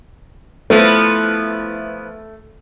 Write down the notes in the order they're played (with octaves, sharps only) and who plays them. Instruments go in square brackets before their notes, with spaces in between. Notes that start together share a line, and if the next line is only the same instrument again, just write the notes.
[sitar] F3 B3 E4 [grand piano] A3